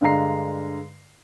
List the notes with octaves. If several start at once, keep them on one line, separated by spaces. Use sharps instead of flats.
G2 D3 G#3 F5 A#5 C7